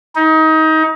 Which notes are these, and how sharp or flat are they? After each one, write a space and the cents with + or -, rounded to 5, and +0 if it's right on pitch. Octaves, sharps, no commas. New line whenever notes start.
D#4 +25